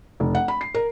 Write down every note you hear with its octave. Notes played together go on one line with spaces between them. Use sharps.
F1
F#5
B5
C7
A#4